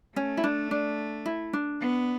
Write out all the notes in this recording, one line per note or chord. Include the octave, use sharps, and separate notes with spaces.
A3 C#4
E4
D4
D4
E4
D4
B3